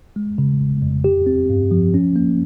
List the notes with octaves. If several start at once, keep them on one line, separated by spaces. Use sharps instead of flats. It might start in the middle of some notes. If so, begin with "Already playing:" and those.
G#3
C#3
G1
F2
G4
C4
G2
F3
C#4
A#3